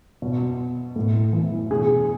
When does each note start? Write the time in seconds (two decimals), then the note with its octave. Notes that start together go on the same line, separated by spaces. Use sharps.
0.22 B2
0.96 A2
1.33 E3
1.70 B2 G#4